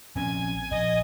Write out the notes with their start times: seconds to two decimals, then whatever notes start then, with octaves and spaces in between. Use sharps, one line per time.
0.15 A#1 C4 C#4 G#5
0.71 A#1 D#5